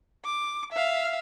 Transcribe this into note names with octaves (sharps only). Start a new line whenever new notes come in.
D6
E5 F5